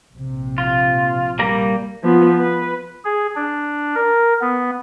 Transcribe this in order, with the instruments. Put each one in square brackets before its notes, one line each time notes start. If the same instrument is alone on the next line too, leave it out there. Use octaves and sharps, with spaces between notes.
[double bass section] A#1 C3
[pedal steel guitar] F4
G3 A#3 A#5
[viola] F3 B3
B4
[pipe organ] G#4
D4
A#4
B3